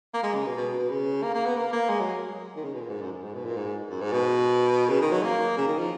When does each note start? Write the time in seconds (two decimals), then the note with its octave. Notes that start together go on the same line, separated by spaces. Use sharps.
0.14 A#3
0.24 G#3
0.35 C#3
0.46 B2
0.57 B2
0.79 B2
0.90 C#3
1.23 A#3
1.35 A#3
1.46 B3
1.57 A#3
1.73 A#3
1.90 G#3
2.01 F#3
2.56 D#3
2.65 C#3
2.74 B2
2.81 A#2
2.90 G#2
3.02 F#2
3.12 F#2
3.23 G#2
3.35 B2
3.45 A#2
3.57 G#2
3.91 F#2
4.01 G#2
4.13 B2
4.90 C#3
5.01 D#3
5.12 F#3
5.23 A#3
5.57 C#3
5.67 D#3
5.79 F3